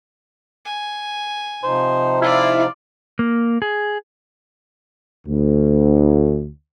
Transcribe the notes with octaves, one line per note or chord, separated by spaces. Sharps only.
G#5
C3 F3 D#4 C5
E4 F4 D5 F5
A#3
G#4
D2